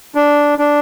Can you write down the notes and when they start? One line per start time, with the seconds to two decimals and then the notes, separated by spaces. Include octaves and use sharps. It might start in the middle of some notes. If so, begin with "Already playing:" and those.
0.15 D4
0.59 D4